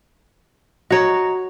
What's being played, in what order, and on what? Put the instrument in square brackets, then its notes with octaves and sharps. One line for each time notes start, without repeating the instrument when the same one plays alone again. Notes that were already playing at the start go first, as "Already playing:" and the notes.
[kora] F#4 C#5 [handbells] D#5 A#5